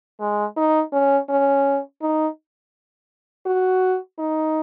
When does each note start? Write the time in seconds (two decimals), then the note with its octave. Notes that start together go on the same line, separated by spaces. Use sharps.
0.20 G#3
0.57 D#4
0.92 C#4
1.29 C#4
2.02 D#4
3.46 F#4
4.19 D#4